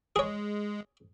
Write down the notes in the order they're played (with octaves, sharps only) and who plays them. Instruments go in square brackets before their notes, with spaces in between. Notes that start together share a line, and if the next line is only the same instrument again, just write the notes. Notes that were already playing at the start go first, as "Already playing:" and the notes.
[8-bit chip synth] G#3 [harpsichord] G#4 C#5